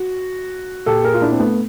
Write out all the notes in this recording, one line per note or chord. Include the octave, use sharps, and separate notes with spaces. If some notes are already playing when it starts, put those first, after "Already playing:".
Already playing: F#4
A#2 G4 A4
G#4 A#4
F4
D4 E4
C4
A3 B3